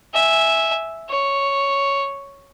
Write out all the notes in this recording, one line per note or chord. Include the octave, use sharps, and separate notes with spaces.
E5 G#5
C#5